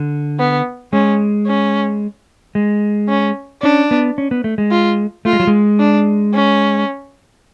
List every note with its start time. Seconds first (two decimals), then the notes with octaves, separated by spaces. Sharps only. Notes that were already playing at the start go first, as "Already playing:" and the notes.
Already playing: D3
0.39 B3
0.93 G#3 C#4
1.47 C#4
2.55 G#3
3.09 C#4
3.63 C#4 D4
3.91 B3
4.18 C#4
4.31 B3
4.44 A3
4.58 G#3
4.71 F4
5.25 A3 F4
5.33 G#3
5.40 F#3
5.47 G#3
5.80 D4
6.34 C#4